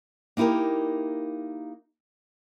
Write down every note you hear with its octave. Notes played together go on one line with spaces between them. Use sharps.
A#3 D#4 E4 G4 A#4